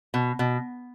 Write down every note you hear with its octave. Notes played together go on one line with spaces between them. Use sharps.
B2
B2